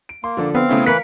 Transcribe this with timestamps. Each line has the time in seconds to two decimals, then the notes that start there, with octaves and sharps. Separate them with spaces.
0.09 D7
0.24 A#3 C6
0.37 D3 F3 D4
0.55 B3 C4 F5
0.69 C#3 A3 C#4 E4
0.86 E3 A#4 B4 F5 F#6 B6 C#7